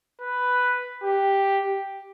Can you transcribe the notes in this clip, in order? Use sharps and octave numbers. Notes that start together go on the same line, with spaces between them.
B4
G4